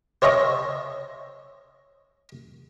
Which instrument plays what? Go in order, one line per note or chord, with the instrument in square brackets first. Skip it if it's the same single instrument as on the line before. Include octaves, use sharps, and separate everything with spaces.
[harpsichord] C5 C#5 D#5 E5 A#5